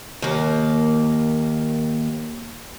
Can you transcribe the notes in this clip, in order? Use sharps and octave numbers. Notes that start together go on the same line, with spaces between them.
D#2 A#3